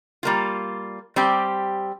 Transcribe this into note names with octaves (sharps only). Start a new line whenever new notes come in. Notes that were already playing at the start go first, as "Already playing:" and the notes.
G3 A#3 F4
G3 C4 G4